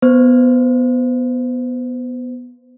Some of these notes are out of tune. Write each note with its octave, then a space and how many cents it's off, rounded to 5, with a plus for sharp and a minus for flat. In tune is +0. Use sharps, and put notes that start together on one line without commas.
B3 +0 C5 -25